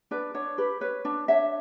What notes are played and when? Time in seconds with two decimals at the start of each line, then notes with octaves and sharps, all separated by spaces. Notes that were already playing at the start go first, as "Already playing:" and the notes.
0.11 D4 B4 D5
0.34 D4 C#5
0.58 G4 B4
0.81 B4 C#5
1.05 D4
1.28 D4 C#5 E5